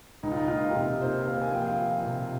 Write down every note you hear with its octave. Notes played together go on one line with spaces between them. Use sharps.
C#2 D#4
F4
D#4
A#3 F4
D#4
G4
C3 F4
A#3 C5
A#3 F5
G#5
F3 G5
F5
F3
C3